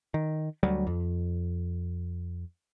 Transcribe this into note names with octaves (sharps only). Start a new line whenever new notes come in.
D#3
D2 F#3 G3
F2